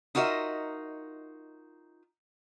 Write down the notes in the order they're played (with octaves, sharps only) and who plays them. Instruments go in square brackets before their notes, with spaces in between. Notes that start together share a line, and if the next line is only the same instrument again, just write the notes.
[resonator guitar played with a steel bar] D#4 F4 F#4 A#4 D#5 E5